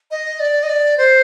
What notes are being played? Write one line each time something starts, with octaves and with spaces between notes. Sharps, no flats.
D#5
D5
D#5
D5
C5